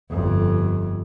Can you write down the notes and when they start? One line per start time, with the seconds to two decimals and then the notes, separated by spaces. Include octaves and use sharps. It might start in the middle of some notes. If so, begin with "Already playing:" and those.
0.10 G1 F2